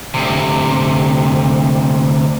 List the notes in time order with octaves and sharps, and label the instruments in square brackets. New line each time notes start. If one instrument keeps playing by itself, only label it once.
[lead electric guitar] D2 C3